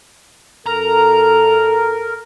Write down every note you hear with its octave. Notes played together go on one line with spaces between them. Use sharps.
F#2 A4 A#4 A#5